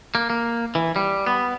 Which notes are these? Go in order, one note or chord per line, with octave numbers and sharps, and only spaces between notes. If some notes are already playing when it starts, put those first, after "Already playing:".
A#3
A#3
E3
G3
B3